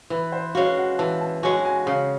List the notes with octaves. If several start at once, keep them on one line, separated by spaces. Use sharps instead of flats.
E3 B4
C5
G#3 C#4 F#4 F5
F#5
E3 A5
A5
G#3 C#4 F#4 G#5
G#5
C#3 F5